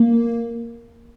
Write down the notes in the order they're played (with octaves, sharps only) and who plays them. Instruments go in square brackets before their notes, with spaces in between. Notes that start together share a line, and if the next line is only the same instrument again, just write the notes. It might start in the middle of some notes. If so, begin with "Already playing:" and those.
Already playing: [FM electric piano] A#3